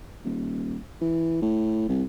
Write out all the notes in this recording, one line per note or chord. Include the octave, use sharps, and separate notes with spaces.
D#1
E3
A2
C2